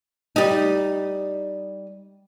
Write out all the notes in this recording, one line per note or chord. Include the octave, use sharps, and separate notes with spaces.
G3 D#4